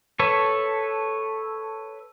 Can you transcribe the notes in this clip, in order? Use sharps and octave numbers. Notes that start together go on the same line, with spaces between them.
A4 B4 C#5